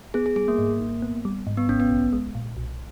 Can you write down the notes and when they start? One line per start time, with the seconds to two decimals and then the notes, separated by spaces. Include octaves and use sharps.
0.14 B3 G#4
0.26 G#4
0.36 G3 G#4
0.48 A#3
0.58 G#2
0.80 G#1
1.02 B3
1.25 G3
1.47 G#2
1.57 B3
1.68 G#1 C#4
1.80 B3
1.90 B1
2.13 G#3
2.35 A#2
2.57 B1